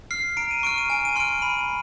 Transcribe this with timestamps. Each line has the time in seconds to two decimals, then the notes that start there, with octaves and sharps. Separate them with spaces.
0.11 F6 C7
0.37 A#5 D7
0.51 D#7
0.63 C#6 F6 D7
0.78 D#7
0.90 G#5 D7
1.05 D#7
1.16 C6 F6 D7
1.42 B5 D#7